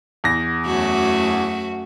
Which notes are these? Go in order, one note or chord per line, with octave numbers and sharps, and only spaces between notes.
E2 A#6
F#2 A3 F#4